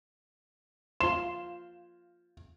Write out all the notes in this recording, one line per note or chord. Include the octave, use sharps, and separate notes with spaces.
F4 C6 E7